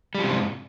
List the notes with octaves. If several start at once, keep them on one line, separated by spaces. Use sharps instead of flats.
G#2 C3 F3 G3